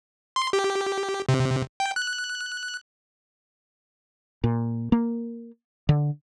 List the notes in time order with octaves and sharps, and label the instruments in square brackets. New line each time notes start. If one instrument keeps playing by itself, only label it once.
[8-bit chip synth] C6
G4
C3
G5
F#6
[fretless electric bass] A#2
A#3
D3